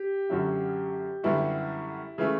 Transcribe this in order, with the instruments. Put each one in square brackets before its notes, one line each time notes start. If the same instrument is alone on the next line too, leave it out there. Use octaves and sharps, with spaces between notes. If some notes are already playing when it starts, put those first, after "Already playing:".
Already playing: [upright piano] G4
[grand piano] F#2 D3 F#3 C#4 E4
[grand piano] F#2 D3 G3 B3 F#4 [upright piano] E4
[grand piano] C#3 E3 A3